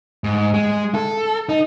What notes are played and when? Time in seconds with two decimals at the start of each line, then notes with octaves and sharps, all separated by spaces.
0.24 G#2
0.54 G#3
0.95 A4
1.49 D#4